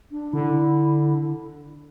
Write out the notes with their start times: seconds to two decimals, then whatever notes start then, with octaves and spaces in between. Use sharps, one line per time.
0.11 D4
0.33 D3 E4